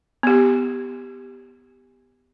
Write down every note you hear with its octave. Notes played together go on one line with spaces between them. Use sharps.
B3 G4